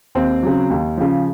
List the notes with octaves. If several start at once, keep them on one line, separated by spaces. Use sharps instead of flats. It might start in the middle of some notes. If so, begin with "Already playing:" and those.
D#2 C4
C#3 F#3
D#2
C#3 F3